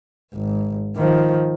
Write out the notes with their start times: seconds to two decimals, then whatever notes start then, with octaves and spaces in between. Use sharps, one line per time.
0.34 G#1
0.96 D#3 F3